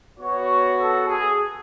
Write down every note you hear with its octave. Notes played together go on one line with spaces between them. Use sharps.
B3 F#4 C#5
A4
G#4